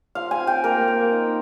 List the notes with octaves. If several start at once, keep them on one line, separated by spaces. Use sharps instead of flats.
F3 F5
G#5
C4
G5
A#3 A#4
A#3
D#4